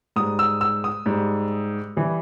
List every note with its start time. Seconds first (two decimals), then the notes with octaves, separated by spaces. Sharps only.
0.16 G#2 G3 D#6
0.39 E6
0.61 E6
0.84 D#6
1.06 G#2 G3
1.96 E3 G3